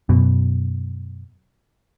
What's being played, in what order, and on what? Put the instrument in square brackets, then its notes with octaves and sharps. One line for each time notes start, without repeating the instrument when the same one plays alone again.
[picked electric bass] F#2 B2